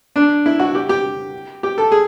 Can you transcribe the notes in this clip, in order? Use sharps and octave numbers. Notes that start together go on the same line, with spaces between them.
D4
E4
F#4
G4
G4
G4
A4
G#4